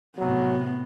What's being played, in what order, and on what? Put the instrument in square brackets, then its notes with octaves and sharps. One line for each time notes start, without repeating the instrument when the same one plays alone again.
[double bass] A2 C3 [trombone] F#3 [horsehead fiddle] B3